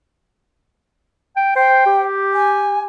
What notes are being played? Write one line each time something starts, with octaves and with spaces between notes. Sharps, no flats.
G5
C5 G5
G4
G#5